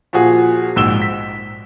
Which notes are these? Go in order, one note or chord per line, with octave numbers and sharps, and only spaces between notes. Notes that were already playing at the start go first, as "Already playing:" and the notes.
A#2 F3 F#4 G#4
A#1 G#2 E6 E7 G7
B6